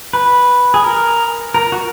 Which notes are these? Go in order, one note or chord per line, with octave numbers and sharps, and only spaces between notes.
B4
G#4
A#4
A#4
F#4